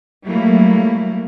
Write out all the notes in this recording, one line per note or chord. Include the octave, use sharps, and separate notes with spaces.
F#3 G3 A3 A#3 E4